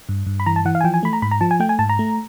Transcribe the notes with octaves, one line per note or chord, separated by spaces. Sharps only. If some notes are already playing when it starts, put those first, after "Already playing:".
G2
G2
B5
E3 A#5
A5
E3 F#5
F5
G#5
F3 G5
G#5
A3 B5
A#5
G#2 B5
A#5
F3 A5
G#5
A3 G5
G#5
G#2 A5
A#5
A3